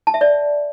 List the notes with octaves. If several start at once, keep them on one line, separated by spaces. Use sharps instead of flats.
A5
E5
D5